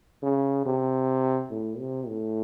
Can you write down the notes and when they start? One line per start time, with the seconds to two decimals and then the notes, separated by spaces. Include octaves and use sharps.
0.22 C#3
0.66 C3
1.50 A2
1.79 C3
2.07 A2